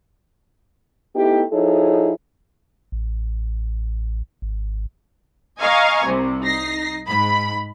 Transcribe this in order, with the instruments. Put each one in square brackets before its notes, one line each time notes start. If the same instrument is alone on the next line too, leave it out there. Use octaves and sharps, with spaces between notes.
[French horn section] A3 B3 D#4 E4 G4
F3 D#4 E4 G#4 A4 C#5
[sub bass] A1
G#1
[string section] D#5 F5 G#5 A#5 C#6
C2 C3
D#4 A#6 C7
G#2 B5